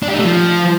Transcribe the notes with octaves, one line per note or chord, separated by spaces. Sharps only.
D4
G4
D#4
A3
F3